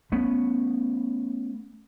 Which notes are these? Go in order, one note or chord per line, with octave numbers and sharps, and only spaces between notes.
A3 B3 C#4